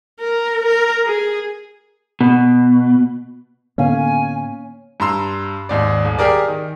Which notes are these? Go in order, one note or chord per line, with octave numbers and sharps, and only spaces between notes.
A#4
A#4
G#4
B2
A2 D3 A#3 B3 C#4 F5 G#5
G2 A#5 C6 E6
D#2 G#2 D5
D#1
G4 G#4 A#4 D5
D#3